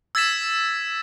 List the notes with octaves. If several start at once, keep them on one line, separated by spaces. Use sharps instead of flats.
E6 G#6 A6 B6 E7